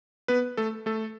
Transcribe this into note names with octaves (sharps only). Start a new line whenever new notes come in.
B3 B4
A3 A4
A3 A4